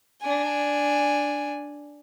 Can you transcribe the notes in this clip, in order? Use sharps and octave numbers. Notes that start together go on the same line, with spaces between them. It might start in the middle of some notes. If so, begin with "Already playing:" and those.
D4 G#5